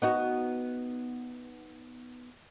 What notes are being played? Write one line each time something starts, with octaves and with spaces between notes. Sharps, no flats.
B3 D#4 F#4